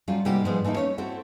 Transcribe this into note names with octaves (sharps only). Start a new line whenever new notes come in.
F#3 G3 A3 C#4 F4
G#2 C3 G3 A#3 F#4 G4
G#2 F3 G3 G#3 B3
E3 A3 A#3 D#4 E4
C#4 C#5
C4 E4 F#4 A4